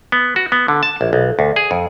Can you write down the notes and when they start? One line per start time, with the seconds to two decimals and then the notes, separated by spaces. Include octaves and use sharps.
0.12 B3
0.36 F#4
0.52 B3
0.68 D3
0.83 A5
1.01 A#1
1.13 B1
1.39 D2
1.56 G#4
1.71 F2